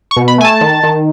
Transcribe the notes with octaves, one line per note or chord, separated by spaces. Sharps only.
C#6
B2
B5
A3 G#5
A5
D#3
D#3